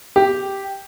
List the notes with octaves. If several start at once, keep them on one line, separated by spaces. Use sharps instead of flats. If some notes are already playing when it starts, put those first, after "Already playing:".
G4